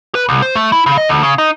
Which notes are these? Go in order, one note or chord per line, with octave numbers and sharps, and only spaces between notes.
B4
C2
C5
A3
E4
C#3
D#5
D2
C#3
D#4